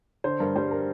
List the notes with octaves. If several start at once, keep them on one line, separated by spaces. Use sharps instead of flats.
D3 C5
G2 A#4
G3 C5
A#4